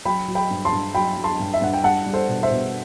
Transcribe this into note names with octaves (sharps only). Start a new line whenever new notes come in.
F#3 G5 B5
F#3
G5 B5
G2
A5 C6
G2
F#3 G5 B5
F#3
A5 C6
G2
E5
G2 F#5
G5
G3 F#5 A5
G3
A4 C5
B2
C5 E5
B2